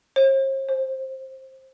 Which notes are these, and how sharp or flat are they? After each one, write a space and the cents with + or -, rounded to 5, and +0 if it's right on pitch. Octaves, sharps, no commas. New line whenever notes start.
C5 +45
C5 +15